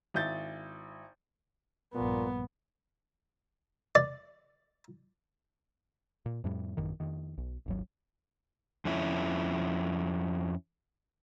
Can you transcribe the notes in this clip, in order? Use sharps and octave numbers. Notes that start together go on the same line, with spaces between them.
G#1 E4 G6 A6
A#1 G2 A#2 B3
D5
A#2
F2 A2 G3
A1 F#2 D#3
F2 D#3
B1
D#1 G#1 F#3
F2 C#4 E4